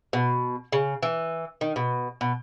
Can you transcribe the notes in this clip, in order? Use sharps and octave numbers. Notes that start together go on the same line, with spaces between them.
B2
C#3
E3
D#3
B2
B2